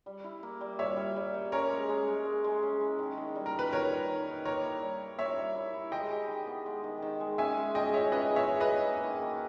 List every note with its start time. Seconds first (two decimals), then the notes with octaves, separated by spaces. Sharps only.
0.06 G3
0.24 E4
0.43 A#3
0.61 G3
0.79 G3 C#5 E5
0.97 G3
1.16 G3
1.34 A#3
1.52 C#4 A#4 C#5
1.70 G#3
1.89 G#3
2.08 G#3
2.25 G#3
2.44 G#3
2.62 C#4
2.80 E4
2.99 D#3
3.17 D#3
3.35 G3
3.46 A#4
3.54 D#3
3.59 B4
3.73 D#3 A#4 C#5
3.91 G3
4.09 D#3
4.27 D#3
4.45 A#3 A#4 C#5
4.64 E4
4.82 G3
5.01 A#3
5.19 E4 C#5 E5
5.37 G3
5.55 E4
5.74 E4
5.92 G#3 D#5 G5
6.10 G4
6.28 D#3
6.47 B3
6.66 G#3
6.84 D#3
7.02 D#3
7.20 G#3
7.38 C#4 E5 G#5
7.57 G#3
7.75 G#3 D#5 G5
7.93 G#4 C#5 E5
8.12 C#4 B4 D#5
8.30 E4
8.36 C#5 E5
8.49 G#4
8.60 B4 D#5
8.67 E4
8.85 A#3
9.03 D#3
9.22 A#3